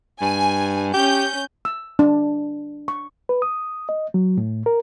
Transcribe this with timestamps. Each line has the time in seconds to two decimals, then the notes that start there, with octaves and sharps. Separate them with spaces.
0.21 G2 G#5
0.94 C#4 G4 G6
1.65 E6
1.99 D4
2.88 C#6
3.29 B4
3.42 D#6
3.89 D#5
4.14 F#3
4.38 A2
4.66 A#4